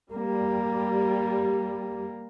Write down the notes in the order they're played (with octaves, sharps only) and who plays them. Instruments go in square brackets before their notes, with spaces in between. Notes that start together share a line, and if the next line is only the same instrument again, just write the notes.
[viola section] G3 [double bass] A#3